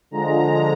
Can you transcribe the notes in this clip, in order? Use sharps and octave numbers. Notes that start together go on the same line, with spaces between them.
D3 F3 G#3 A#5